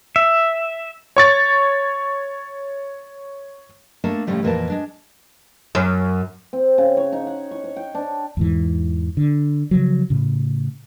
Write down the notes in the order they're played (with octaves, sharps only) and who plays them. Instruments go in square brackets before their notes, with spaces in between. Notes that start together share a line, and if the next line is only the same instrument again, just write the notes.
[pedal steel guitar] E5
[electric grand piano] C#5 C#6 A6
[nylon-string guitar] A3 A#3 D4 A4 A5
A2 C#3 F3 G3 A3
F2 A#2 E3 A#3 A#4 A5
G#3 D4
[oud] F#2
[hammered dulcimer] C4
C#3
C#5
D#4
F#5
C#6
C#5
G5
D4
[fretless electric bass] E2 G#2 E3
D3
C#3 F3 F#3
A2 C#3